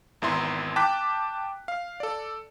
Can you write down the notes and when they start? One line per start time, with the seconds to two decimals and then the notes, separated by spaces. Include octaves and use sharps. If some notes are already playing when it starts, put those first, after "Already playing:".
0.22 G#1 E2 E4 C6
0.76 G5 A5 D6 F#6 B6
1.68 F5
2.00 A4 D5